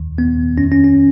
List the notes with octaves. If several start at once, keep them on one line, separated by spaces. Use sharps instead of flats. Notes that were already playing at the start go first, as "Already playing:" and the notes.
Already playing: D#2 D#3
D#2 D#3 B3
F2 D#3 C#4
C#4
C#4